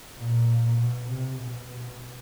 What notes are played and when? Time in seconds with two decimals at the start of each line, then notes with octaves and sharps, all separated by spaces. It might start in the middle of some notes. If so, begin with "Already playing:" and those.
0.16 A#2
0.79 B2
1.11 C3
1.41 B2